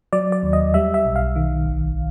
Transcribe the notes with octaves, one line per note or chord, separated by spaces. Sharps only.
F#3 D5
D5
D#2
D#5
G3 E5
E5
B1
F5
D#3
G#1